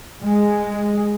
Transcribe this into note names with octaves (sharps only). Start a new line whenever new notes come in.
G#3